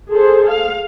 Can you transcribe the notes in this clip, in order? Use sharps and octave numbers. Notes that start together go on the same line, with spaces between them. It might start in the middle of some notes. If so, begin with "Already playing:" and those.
G#4 A4 C5
F5